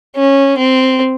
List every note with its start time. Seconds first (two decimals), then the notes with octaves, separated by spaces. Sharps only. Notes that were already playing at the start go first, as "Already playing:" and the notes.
0.16 C#4
0.57 C4